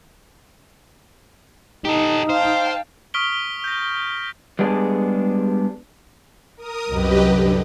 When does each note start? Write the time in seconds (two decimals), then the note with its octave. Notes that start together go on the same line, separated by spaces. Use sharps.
1.85 D#4 G4 A4
2.30 C5 F5 G5 A5
3.14 C#6 D#6 F6 B6 D7 G7
3.33 G7
3.64 G6 A#6
4.59 G3 G#3 B3 D4 G#4
6.57 A#4 D#6
6.89 C2 F#2 F#3 G4 B4 D#5
7.30 D3